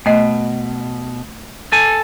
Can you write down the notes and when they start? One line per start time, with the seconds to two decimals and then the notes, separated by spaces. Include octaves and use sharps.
0.06 B2 A3 D#5
1.72 A4 G#5